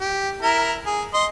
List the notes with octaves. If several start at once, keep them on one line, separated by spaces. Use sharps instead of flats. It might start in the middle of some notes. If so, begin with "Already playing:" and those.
G4
E4 A#4 A#5
G#4
D#5 C6